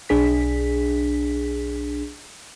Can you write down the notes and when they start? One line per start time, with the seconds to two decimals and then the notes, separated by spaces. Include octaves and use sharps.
0.09 B1 D4 G#4 B6